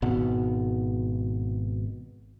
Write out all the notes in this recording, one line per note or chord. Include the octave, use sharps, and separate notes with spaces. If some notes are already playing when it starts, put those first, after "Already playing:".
G#1 B2 B3